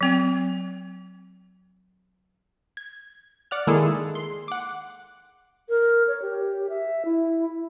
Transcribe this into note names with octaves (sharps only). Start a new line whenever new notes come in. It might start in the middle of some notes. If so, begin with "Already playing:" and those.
F#3 C4 G5
G#6
D5 F#5 F6
D#3 G#3 A#3 E4 G#4 A4
C6
F#5 D6
A#4
C#5
G4
E5
E4